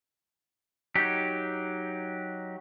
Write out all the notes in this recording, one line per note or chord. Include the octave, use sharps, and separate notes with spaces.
F#3 D#4 G4